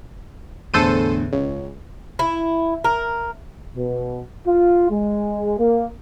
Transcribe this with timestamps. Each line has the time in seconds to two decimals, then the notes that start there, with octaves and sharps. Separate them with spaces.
0.74 E2 A2 D3 A4 C5 D#7
1.33 C#2 C#5
2.19 E4
2.84 A#4
3.76 B2
4.46 F4
4.91 G#3
5.59 A#3